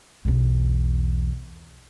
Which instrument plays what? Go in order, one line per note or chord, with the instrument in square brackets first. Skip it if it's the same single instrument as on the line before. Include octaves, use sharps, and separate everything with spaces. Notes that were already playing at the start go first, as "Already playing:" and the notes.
[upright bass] B1 E2